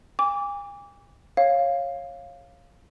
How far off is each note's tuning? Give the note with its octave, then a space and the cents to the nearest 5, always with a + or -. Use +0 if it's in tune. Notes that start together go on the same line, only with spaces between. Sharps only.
G#5 -45 D6 -25
C#5 -20 F5 +0